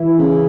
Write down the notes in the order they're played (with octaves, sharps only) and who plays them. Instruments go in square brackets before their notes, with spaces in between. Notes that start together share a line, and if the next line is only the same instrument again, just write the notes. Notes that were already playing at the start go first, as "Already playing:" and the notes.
Already playing: [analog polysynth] E3 E4
[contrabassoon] C#3